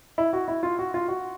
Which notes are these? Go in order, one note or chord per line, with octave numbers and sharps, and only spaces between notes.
E4
F#4
E4
F4
F#4
F4
F#4